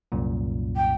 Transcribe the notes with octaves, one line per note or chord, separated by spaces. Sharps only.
C2 F#2 A#2
G5